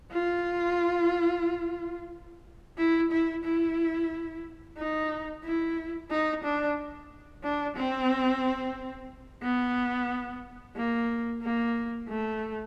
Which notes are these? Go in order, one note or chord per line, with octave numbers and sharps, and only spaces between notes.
F4
E4
E4
E4
D#4
E4
D#4
D4
D4
C4
B3
A#3
A#3
A3